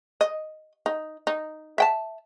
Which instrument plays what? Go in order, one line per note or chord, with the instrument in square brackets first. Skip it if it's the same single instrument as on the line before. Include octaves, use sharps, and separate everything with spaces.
[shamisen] D#5
D#4
D#4
E5 G5 A5